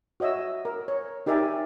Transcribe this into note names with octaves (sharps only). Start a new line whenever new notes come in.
F#4 C#5 D#5 E5 E6
A#4
C#5
D#4 G4 A#4 D5 E5 G#5